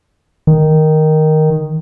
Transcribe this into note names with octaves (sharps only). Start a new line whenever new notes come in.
D#3